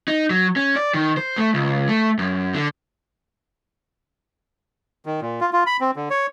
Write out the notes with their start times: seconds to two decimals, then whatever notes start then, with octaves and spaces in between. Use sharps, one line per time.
0.08 D#4
0.30 F#3
0.56 C#4
0.76 D5
0.94 D#3
1.17 C5
1.37 A3
1.54 C#2
1.89 A3
2.19 F#2
2.54 D3
5.06 D#3
5.21 A#2
5.41 F4
5.53 F4
5.66 B5
5.81 C4
5.96 D3
6.10 C#5